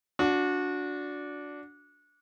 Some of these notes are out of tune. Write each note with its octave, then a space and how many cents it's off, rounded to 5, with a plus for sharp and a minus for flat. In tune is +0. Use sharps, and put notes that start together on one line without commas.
D4 -15 F#4 -25